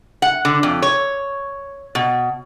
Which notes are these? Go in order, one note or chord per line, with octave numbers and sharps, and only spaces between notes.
F#5
D3
F2
C#5
B2